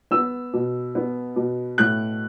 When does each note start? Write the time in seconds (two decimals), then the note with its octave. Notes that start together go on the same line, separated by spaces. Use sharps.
0.11 B3 E6
0.53 B2
0.95 B3
1.36 B2
1.78 A2 F#6